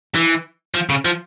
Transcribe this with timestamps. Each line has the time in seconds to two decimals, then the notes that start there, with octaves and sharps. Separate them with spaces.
0.15 E3
0.74 F3
0.89 C#3
1.05 F3